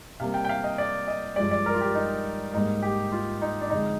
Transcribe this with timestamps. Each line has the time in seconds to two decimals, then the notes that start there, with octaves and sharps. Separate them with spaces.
0.20 C3 G3 A#3 F5
0.34 G5
0.45 G5
0.49 F5
0.64 D#5
0.78 D5
1.08 D#5
1.36 G2 F3 G#3 D5
1.51 D5
1.66 A#4
1.74 F4
1.81 G4
1.95 D#4
2.54 G#2 G3 A#3 D#4
2.82 G4
3.12 F4
3.42 D#4
3.61 D4
3.70 F2 D3 G#3 D#4